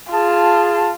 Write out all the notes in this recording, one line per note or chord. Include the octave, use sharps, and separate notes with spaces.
F4 G#4 A5